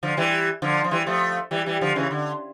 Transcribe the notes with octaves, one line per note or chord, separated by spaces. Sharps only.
D3 F3
E3 G3
D3 F3
F3
E3 G3
F3 A3
E3 G3
E3 G3
D3 F3
C#3 E3
D3